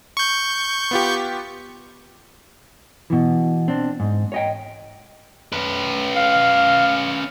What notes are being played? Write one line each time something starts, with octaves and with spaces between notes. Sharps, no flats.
C#6 G6
B3 F4 G4
B2 E3
C4 D4
G#2
C#5 D#5 G5
C#4 B4
F5